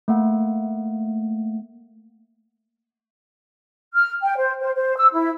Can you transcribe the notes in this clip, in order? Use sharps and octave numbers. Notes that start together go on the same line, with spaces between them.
A3 A#3 F#5
F6
G5
C5
C5
C5
E6
E4